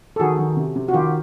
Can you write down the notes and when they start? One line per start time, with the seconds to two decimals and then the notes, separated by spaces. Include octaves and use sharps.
0.16 A4
0.20 D#3 F#4 G#4
0.39 D#3
0.57 C3
0.76 C3
0.88 F#4
0.94 D#3 F4 G4